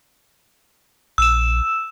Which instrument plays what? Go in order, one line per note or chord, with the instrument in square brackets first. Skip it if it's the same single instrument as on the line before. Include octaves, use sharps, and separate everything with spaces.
[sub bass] A#1 [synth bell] E6 E7